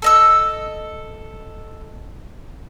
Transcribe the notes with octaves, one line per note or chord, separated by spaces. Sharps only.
A4 D#5 E6